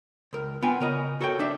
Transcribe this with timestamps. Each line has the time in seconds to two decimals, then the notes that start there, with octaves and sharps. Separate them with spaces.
0.33 C#2 A#4
0.62 B3 F4 G5 G#5
0.80 C#3 A#4 D#5
1.21 F#4 A4 A#4 C#5 F5 G5
1.39 D4 D#4 E5